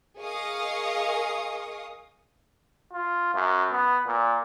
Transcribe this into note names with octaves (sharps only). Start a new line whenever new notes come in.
G#4 A#4 D#5 F5 C#6 D#6
F4
F#2
B3
A#2